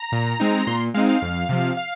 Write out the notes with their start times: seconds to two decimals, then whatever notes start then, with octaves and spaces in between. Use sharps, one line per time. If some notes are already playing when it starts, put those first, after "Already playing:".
Already playing: A#5
0.12 A#2
0.40 G#3 C4 D#4
0.67 A#2 C6
0.94 G#3 C4 D#4 F5
1.09 F5
1.22 F2
1.49 C3 F3
1.77 F5